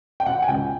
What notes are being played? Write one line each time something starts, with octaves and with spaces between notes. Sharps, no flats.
G5
B2 F#5
G#5
C#2 G5